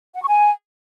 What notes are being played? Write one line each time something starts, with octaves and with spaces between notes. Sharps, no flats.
F#5
C#6
G#5